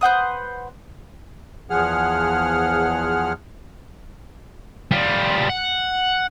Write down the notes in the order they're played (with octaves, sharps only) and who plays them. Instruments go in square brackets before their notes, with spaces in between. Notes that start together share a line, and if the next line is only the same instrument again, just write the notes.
[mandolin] B4 C5 F#5 D#6
[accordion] E2 F3 G#4 F#5 F6
[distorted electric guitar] G3 F4
F#5